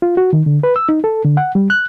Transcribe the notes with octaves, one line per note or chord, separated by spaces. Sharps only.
F4
F#4
D#3
D3
B4
E6
D#4
A4
D3
F#5
G3
F#6